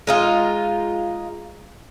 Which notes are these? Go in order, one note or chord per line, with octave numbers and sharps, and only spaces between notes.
G#3 D#4 F4